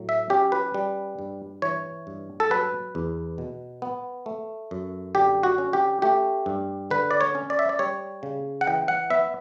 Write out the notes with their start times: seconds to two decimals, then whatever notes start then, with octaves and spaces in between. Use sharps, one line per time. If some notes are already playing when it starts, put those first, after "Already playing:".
Already playing: A2 F#3
0.09 E5
0.30 C#4 G4
0.52 B4
0.74 G3
1.19 G2
1.62 E3 C#5
2.07 G2
2.40 A4
2.50 F#3 B4
2.95 E2
3.38 B2
3.82 B3
4.26 A3
4.71 F#2
5.15 D3 G4
5.43 F#4
5.58 C#4
5.73 G4
6.02 A3 G4
6.46 G2
6.91 D3 B4
7.11 D5
7.21 C#5
7.35 C#4
7.50 D5
7.59 E5
7.69 D5
7.79 G3 C#5
8.23 C#3
8.61 F#5
8.67 E3 G5
8.88 F#5
9.10 B3 E5